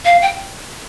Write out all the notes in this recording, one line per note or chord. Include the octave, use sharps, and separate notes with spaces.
F5
G5